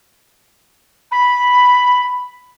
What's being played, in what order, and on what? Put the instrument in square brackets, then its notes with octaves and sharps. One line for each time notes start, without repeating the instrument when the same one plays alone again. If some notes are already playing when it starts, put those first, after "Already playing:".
[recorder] B5